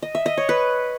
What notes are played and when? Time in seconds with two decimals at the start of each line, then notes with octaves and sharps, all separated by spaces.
0.03 D#5
0.15 E5
0.26 D#5
0.37 C#5
0.49 B4